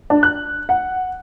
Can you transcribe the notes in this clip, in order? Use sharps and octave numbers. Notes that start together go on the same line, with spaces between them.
D4
F#6
F#5